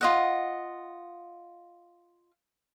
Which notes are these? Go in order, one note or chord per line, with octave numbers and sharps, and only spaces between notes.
F4 D#5 F#5